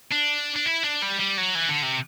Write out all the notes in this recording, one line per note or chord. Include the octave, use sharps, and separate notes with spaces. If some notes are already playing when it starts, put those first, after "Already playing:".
D4
D4
E4
D4
G3
G3
F#3
E3
D3
C3